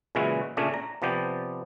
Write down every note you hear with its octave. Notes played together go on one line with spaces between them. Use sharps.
A#2 C#3 E3 G#3 E4 F#4
A#2 C#3 A3 C#4 D4
A#5
C3 F3 B3 D5 G5